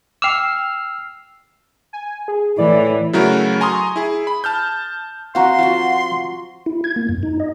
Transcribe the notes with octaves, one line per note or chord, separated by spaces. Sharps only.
G5 D6 E6 F6 C7
G#5
G#4
A2 E3 D5
C#3 F#3 A3 E4 F#4 A#4
G#5 A#5 C6 C#6 D#6
E4 G#4
B5
A5 F6 G6
C4 F#4 F5 F#5 A#5 C6
F3 F#4
E4
G#6
A#3
F#2
D#4
D#5